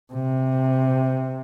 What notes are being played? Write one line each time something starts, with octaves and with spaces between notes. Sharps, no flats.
C3